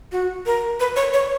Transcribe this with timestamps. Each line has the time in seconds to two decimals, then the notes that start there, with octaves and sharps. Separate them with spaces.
0.12 F#4
0.46 A#4
0.80 B4
0.96 C#5
1.14 C#5